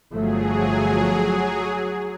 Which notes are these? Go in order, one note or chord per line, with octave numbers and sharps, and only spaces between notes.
G1 F3 F#3 A3 G#4